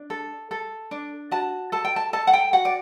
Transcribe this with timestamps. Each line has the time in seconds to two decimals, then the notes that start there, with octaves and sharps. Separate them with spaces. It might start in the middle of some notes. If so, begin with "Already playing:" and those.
Already playing: D4
0.10 A4
0.51 A4
0.91 D4
1.31 F#4 A5
1.72 A4 A5
1.85 G5
1.96 A5
2.13 A4 A5
2.27 F#5
2.33 G5
2.53 F#4 F#5
2.65 D5